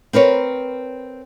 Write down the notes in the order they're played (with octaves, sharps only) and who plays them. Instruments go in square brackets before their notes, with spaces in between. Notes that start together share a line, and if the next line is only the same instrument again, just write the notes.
[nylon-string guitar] C4 A#4 B4 C#5